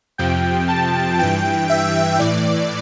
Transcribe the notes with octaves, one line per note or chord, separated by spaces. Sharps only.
F2 C3 F3 G5
A5
G2 E3 G5
E5
A2 E3 D5